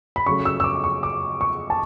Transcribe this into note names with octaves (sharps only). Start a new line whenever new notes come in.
B5
C#3 F#3 A3 C#6
E6
E6
D6
C#6
D6
C#6
A5